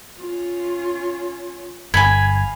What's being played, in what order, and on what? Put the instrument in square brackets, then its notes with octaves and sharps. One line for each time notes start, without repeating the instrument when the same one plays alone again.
[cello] C#4 F4
[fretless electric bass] G1 [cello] F5 [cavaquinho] G#5 B5 [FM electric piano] G#6